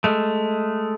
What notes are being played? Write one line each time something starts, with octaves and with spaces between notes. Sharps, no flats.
G#3 A3